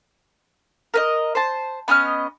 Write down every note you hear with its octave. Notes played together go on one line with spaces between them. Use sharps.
A#4 B4 D#5
C5 A5
B3 C#4 D#5 F6